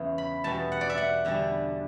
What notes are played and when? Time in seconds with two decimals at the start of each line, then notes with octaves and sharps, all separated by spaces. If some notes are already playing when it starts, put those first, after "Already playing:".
Already playing: E2 C#3 E3 B3
0.18 B5
0.44 E2 B2 G3 B3 A5
0.72 F#5
0.81 D5
0.90 E5
0.97 F#5
1.25 E2 D3 G3 D4